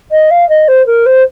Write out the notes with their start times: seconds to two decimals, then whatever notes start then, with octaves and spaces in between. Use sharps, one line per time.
0.11 D#5
0.31 F5
0.49 D#5
0.68 C5
0.86 A#4
1.06 C5